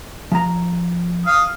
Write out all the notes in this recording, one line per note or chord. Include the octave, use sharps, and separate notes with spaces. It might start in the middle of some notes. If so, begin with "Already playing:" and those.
F3 A#5
F5 D#6